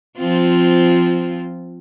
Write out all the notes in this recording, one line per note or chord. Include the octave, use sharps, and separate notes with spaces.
F3 C4 F4